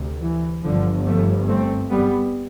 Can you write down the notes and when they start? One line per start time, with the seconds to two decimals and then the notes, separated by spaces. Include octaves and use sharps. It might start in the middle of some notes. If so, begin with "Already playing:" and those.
Already playing: D2 C3
0.21 E3
0.64 G1 G2 D3 F3
1.06 F3 A3
1.48 A3 C4
1.90 G3 B3